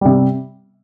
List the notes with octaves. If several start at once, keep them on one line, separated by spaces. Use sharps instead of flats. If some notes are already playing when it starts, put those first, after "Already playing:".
C3 G3